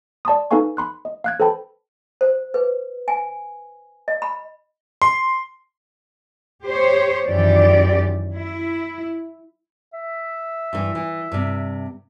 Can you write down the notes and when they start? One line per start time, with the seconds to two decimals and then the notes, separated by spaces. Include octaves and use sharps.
0.25 D5 A5 C6 D#6
0.51 D#4 A4 B4 F5 G#5 C#6
0.77 B5 C6 F#6
1.05 D#5
1.24 F5 F#6 G#6
1.40 A4 B4 C5 G5 A5 B5
2.21 C5
2.54 B4
3.08 G#5
4.08 D#5
4.22 B5
5.02 C6
6.67 G4 C5 C#5
7.25 F#2 D#3 E3 G4 D5
8.35 E4
9.93 E5
10.73 G2 E3
10.95 E3
11.32 G2 C3